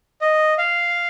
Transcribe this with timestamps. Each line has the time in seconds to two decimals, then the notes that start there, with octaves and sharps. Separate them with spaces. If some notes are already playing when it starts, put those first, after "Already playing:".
0.21 D#5
0.58 F5